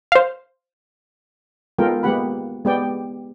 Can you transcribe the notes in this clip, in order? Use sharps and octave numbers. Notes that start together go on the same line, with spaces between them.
C5 F5
G#3 B3 F4 A4 A#4 G5
G#3 A#3 B3 G4 F#5 B5
G#3 B3 G4 D5 G5